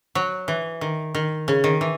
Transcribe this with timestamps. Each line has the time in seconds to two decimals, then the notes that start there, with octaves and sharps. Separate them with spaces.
0.15 F#3
0.48 E3
0.81 D#3
1.15 D#3
1.48 C#3
1.64 D#3
1.81 E3